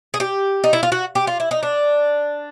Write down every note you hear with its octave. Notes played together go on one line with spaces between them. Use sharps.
G#4
G4
D#4
E4
F4
F#4
G4
F4
E4
D#4
D4